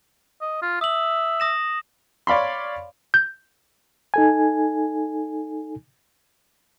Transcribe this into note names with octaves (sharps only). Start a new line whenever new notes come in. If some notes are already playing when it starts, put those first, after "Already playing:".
D#5
F4
E5 D#6 F#7
D#6 A#6 E7
C#5 D5 F5 B5 C6
G6
D#4 A4 G#5